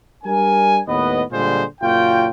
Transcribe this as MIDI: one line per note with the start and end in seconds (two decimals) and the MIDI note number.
0.24 0.81 55
0.24 0.81 62
0.24 0.81 70
0.24 0.81 80
0.87 1.22 39
0.87 1.22 45
0.87 1.22 59
0.87 1.22 71
0.87 1.22 75
1.32 1.64 46
1.32 1.64 50
1.32 1.64 55
1.32 1.64 56
1.32 1.64 65
1.32 1.64 72
1.81 2.29 30
1.81 2.29 46
1.81 2.29 65
1.81 2.29 66
1.81 2.29 79